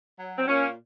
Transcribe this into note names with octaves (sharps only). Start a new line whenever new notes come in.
F#3
C4
A#2 A#3 C#4